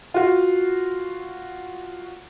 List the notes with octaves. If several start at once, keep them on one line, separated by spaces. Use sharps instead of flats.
F4 F#4